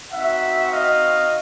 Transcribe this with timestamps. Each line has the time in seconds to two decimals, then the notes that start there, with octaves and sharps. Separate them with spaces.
0.12 C4 D#4 F#4 E5 F#5
0.71 D#5 F5